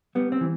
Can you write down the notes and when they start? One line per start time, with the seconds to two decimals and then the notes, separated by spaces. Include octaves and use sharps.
0.15 G3 B3
0.32 C4
0.41 E3